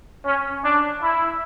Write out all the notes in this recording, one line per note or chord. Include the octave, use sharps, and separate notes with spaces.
C#4
D4
E4